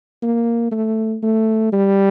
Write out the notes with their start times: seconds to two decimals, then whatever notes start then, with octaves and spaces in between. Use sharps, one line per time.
0.22 A#3
0.71 A3
1.22 A3
1.73 G3